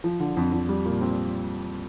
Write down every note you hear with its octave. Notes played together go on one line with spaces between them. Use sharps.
F3
D3
F2
F2
G3
A#2
C4